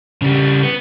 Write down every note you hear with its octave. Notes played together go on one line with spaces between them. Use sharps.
C#3 G3
B3